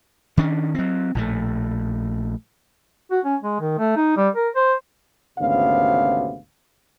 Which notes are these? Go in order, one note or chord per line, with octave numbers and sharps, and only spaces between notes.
D#3 C#4 D4
F#3 C4
A#1 A2 A3
F#4
C#4
G#3
D#3
A3
D#4
G3
A#4
C5
G#1 D2 C3 B3 C#4 F5